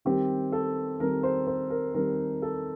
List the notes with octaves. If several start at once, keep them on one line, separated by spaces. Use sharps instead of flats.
D#3 G3 C4 G4
A4
D#3 G3 C4 A#4
C5
C5
A#4
D#3 G3 C4 A#4
A4